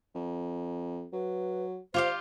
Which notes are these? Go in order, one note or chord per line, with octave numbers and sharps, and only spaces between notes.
F2
F#3 B4
F4 G4 C5 F5